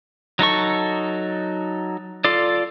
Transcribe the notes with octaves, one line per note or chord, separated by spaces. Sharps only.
F#3 D#4 A4 C#6
F4 A4 D5